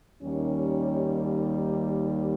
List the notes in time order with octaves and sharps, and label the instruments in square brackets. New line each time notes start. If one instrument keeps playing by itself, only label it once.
[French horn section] D#2 D#3 G3 C#4